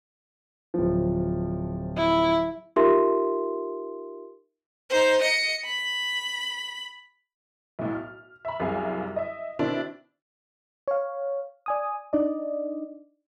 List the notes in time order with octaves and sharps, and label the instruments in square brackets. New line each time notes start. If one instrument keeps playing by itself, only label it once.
[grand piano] D1 F3
[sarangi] E4
[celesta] D#4 F4 G4 A#4 E5 C6
[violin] D#4 C5
D#5 C#7
B5
[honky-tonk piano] B1 A2
F6
E5 B5
C2 F#2 C3 G#4 F5 G#5
D#5 E5
B2 D#3 C4 D4 E4
[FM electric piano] C#5 F5
D5 G#5 D#6
D4 D#4 D5 D#5